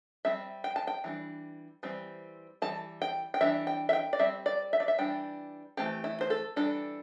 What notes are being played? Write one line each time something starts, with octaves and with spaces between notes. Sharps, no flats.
G3 C4 E5
G5
A5
G5
E3 G3 D4
E3 G3 C4
E3 G3 A5
G5
G5
E3 G3 D4 E5
G5
E5
G5
D5
G3 C4 E5
D5
E5
D5
E5
E3 G3 D4 G5
E3 A3 C4 G4
E4
C5
A4
E3 G3 D4 A4